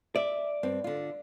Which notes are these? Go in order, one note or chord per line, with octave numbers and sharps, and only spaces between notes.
D5 E5
G2 C4
D3 F4